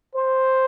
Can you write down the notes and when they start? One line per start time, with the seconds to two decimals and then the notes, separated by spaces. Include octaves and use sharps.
0.15 C5